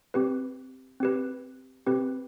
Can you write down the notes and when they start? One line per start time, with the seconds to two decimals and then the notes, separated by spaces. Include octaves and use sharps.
0.14 C4 G4 B4
1.00 C4 G4 B4
1.86 C4 G4 B4